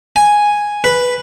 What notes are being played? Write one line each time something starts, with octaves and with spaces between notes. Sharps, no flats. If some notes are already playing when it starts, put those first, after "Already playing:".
G#5
B4